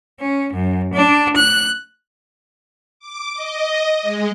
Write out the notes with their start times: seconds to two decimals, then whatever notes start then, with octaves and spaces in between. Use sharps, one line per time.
0.20 C#4
0.55 F#2
0.93 D4
1.36 F#6
3.00 D6
3.34 D#5
4.02 G#3